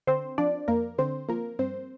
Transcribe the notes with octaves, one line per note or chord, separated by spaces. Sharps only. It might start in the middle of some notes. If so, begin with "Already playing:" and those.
D3 C4 C5
F3 D4 D5
F2 A#3 A#4
D3 C4 C5
F3 A#3 A#4
G2 C4 C5